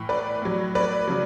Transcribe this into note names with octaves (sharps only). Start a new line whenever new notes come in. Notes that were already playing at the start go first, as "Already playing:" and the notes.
Already playing: A2 E3
B4 D5
A2 F#3
B4 D5
C#3 F#3